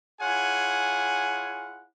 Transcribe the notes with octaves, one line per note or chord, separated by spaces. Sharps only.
E4 F4 G#4 C#5 F#5 G#5